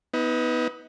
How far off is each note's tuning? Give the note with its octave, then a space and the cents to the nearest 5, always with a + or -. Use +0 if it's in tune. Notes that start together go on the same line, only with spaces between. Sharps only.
B3 +0 D#4 +40